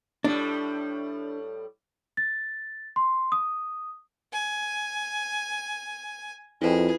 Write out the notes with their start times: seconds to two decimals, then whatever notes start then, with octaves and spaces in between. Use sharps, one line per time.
0.24 A2 G3 D4
2.17 A6
2.96 C6
3.32 D#6
4.33 G#5
6.62 F2 E4 F4 G#4 B4